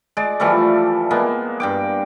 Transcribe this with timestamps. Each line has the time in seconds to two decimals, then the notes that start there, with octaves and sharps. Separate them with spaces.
0.17 G#3 D5
0.40 E3 F3 G3 A3
1.11 G#3 A#3 B3
1.60 G2 G5 D6